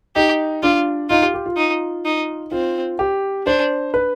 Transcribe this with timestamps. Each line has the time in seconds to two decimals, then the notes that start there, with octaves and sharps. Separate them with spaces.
0.16 D#4 G4
0.63 D4 F4
1.09 D#4 F4
1.22 G4
1.34 G4
1.46 F4
1.57 D#4
2.05 D#4
2.52 C4 F4
2.99 G4
3.47 D4 C5
3.94 B4